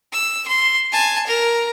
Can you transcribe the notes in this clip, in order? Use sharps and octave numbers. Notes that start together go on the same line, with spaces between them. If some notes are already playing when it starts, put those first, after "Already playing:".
E6
C6
G#5 A5
A#4